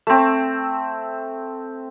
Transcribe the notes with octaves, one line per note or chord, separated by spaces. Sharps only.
A3 C4